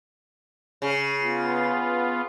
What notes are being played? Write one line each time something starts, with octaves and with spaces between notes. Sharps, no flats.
C#3
B3 F4